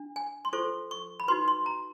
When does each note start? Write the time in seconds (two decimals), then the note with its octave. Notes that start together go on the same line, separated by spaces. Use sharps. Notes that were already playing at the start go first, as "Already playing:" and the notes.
Already playing: D4
0.16 G#5
0.45 C6
0.53 F4 A4 C5 C#6
0.91 C#6
1.20 B5
1.28 D#4 F#4 B4 C6
1.48 C6
1.66 A#5